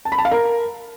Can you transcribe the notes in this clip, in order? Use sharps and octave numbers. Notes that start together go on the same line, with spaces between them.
A5
B5
A5
F5
A#4